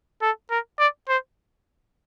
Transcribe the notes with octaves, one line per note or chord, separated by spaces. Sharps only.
A4
A#4
D5
C5